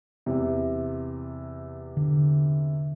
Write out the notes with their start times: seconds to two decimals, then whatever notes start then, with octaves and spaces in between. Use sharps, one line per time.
0.26 E2 C3
1.97 D3